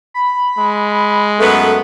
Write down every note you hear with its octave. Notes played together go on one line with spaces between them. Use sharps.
B5
G#3
F#2 A3 B3 A4